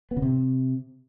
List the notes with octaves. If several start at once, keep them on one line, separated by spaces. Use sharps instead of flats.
B3
C#3
C3